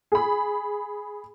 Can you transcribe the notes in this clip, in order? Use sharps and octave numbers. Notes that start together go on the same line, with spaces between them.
G#4 B5